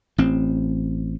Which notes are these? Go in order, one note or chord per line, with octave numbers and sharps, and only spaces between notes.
A1 C4